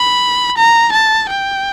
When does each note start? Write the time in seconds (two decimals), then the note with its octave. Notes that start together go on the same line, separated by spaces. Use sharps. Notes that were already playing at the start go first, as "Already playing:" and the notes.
Already playing: B5
0.58 A#5
0.93 A5
1.29 G5